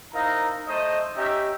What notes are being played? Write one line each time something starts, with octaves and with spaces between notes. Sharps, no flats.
D#4 E4 A#4 C5 F5 A#5
A3 D#4 C5 D#5
C#4 D#4 G4 E5